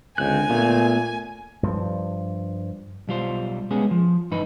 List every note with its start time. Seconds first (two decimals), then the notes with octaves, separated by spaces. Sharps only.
0.18 C#2 D3 C4 G#5 F#6
0.50 A#2 A3 B3
1.63 G2 F3
3.08 B1 G3 F4 C5
3.71 G#3 B3 C#4 G#4
3.91 F3
4.31 G2 E3 D#4 B4